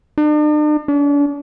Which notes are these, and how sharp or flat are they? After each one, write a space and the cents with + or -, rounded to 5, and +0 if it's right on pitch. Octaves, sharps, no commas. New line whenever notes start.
D4 +45
D4 -40